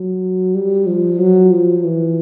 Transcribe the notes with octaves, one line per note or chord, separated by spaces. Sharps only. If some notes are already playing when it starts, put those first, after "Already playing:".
Already playing: F#3
G3
F3
F#3
F3
E3